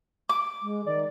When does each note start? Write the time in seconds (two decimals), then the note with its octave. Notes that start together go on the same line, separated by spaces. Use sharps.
0.29 D6
0.62 G#3
0.86 D#3 D5